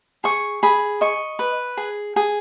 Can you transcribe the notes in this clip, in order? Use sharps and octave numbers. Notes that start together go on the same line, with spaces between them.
G#4 C#6
G#4 B5
D#5 C#6
B4
G#4
G#4